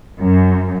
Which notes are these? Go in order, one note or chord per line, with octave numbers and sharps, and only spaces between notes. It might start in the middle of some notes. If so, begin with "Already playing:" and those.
F#2